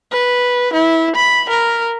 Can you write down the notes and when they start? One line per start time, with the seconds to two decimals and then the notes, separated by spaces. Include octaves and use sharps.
0.12 B4
0.73 E4
1.16 B5
1.49 A#4